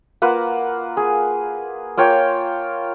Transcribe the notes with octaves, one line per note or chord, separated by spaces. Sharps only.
A#3 F4 B4 F#5
G#4
A#3 F4 C#5 G5